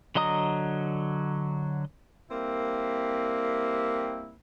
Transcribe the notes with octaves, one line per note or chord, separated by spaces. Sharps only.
D3 F#3 D#5 A#5 D#6
G3 A#3 C4 E4